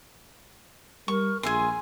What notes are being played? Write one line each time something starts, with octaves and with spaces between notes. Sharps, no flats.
G3 A#4 C#6
A#1 G#4 E5 G#5 C6